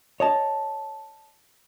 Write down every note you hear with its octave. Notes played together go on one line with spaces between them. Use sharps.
C#5 D#5 A5